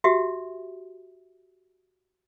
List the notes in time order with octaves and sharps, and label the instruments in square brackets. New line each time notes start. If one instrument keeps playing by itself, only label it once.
[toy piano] F#4 G4 E5